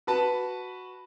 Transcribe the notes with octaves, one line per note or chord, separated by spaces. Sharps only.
F#4 B4 A5 B5